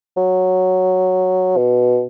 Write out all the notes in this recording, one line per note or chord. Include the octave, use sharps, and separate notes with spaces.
F#3
B2